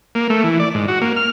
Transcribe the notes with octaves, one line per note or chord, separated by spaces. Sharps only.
A#3
A3
E3
D5
G#2
F#4
A#3
F6